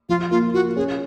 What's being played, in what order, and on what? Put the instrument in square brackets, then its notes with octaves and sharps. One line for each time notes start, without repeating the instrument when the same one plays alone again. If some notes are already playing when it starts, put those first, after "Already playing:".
[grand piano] F3 [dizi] F4
[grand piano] A#3 [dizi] F4
[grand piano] F4 [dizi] F#4
[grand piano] C#4 [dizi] G#4